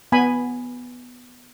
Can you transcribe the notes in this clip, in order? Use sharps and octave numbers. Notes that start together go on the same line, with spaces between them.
B3 G#5 B5